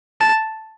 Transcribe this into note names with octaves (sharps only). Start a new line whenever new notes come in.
A5